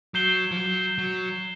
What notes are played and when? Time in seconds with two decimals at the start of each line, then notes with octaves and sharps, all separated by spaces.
0.14 F#3 G6 C7 E7 G7
0.51 F3
0.57 F#3
0.98 F#3